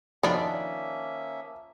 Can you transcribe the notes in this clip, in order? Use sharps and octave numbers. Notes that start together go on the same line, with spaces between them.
D#3 F3 A#3 C#4 D4 E5